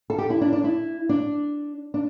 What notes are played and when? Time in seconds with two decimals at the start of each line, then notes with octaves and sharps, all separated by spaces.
0.10 A4
0.18 G4
0.30 E4
0.41 D4
0.53 D4
0.64 E4
1.09 D4
1.94 D4